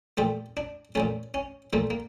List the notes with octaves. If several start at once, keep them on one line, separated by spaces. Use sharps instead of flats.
A#2 F3 A3 G4
D4
A#2 F3 A3 C#4
C#4
A#2 F3 A3 A#3
A#3